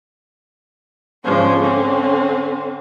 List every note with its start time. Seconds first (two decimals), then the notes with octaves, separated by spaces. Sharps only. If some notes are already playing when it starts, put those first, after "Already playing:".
1.24 G#2 C#3 F3 D4
1.61 D3 C4 C#4